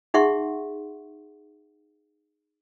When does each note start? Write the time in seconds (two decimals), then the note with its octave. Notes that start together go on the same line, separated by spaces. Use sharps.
0.14 D#4 G#4 E5 F#5 C6 C#6